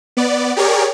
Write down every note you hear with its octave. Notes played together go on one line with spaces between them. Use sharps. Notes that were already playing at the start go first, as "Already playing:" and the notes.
B3 D5
G4 G#4 A#4 C#5 D5